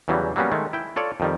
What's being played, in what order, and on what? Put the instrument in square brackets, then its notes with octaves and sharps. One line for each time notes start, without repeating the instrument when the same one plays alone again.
[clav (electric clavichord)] E2 C#3 E3 F#3 G3
F#3 G3 A#3 B3 C#4
D#3 G#3 A3
E4 G5
F4 A4 C#5 D5
F2 D#3 G3